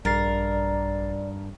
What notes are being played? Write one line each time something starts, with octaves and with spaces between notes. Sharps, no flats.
A#1 G2 A#4 D5 A6 C7